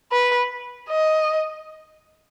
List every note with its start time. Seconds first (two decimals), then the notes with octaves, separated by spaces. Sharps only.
0.12 B4
0.89 D#5